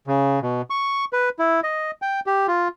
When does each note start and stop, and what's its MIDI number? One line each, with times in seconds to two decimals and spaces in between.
0.07 0.40 49
0.42 0.62 47
0.70 1.05 85
1.13 1.29 71
1.39 1.60 64
1.64 1.91 75
2.02 2.20 79
2.26 2.47 67
2.47 2.68 65